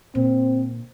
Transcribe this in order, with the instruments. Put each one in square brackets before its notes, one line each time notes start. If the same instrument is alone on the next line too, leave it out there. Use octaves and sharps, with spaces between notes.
[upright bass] A#2 D3 [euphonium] C4